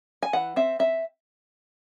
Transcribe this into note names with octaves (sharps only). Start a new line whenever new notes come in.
G#5
E3 F#5
C4 E5
C4 E5